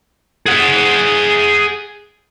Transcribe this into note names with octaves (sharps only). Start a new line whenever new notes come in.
G#4 F#5